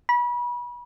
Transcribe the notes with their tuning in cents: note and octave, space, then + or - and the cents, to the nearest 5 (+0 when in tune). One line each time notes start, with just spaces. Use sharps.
B5 -30